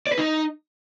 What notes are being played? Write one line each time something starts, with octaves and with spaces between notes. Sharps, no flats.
D5
B4
D#4